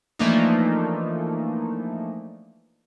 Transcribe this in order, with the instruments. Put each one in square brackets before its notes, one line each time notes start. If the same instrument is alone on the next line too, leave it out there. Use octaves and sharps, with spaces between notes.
[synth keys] E3 F3 A3 A#3 D4 D#4